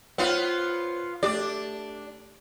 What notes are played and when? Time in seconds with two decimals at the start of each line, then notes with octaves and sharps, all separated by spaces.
0.18 B3 F4 C5 C#5
1.23 A3 D4 G4 D5